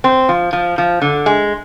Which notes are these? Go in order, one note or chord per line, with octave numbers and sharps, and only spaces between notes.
C4
F3
F3
F3
D3
G#3